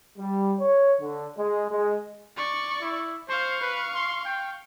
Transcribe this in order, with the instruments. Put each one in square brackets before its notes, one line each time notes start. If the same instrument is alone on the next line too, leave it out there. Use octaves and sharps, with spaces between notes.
[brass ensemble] G3
C#5
D3
G#3
G#3
[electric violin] D5 C#6
[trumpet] E4
[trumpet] C5 [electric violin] F5 C#6
[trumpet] B4
C6
G5